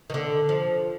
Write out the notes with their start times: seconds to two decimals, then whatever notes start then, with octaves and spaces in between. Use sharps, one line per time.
0.10 D#3
0.14 D3
0.49 F3